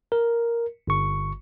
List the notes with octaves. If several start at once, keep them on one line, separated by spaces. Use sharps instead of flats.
A#4
G1 C#6